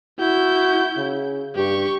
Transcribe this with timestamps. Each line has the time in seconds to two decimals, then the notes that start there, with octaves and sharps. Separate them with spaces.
0.19 E4 F#4 G6
0.97 C#3
1.56 G2 G4 C#6